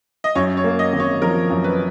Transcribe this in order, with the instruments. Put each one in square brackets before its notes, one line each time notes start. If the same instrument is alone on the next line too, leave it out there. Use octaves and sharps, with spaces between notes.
[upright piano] D#5
[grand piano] F#2 [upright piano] C#5
[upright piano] C#5
[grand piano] A#3
[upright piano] D#5
[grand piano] G#1
[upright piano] C#5
[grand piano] F3 [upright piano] A#4
[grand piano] F#2
[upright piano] B4